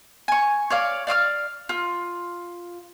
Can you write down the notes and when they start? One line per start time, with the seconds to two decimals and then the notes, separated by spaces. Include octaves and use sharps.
0.28 G#5 C#6
0.70 C#5 D5 F5
1.07 D5 F5 D6 F6
1.69 F4